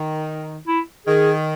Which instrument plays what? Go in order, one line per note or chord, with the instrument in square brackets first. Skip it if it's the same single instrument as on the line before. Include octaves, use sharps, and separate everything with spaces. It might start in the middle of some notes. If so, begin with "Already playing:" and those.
Already playing: [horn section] D#3
[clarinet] E4
[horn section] D#3 [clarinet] G#4